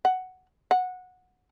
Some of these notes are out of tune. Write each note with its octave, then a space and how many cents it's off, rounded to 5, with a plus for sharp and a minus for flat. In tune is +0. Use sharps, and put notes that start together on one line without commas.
F#5 +5
F#5 -15